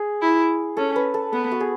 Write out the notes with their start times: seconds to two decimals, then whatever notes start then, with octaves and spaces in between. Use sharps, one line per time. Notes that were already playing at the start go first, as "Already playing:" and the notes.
Already playing: G#4
0.22 E4
0.77 C#4 A4
0.96 B4
1.14 A4
1.33 B3 A4
1.52 F#4
1.60 G#4